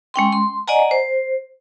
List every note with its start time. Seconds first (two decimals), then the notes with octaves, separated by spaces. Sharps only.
0.14 G#3 C#4 G5 C6
0.32 C6
0.68 D5 D#5 F#5 G#5 A#5
0.91 C5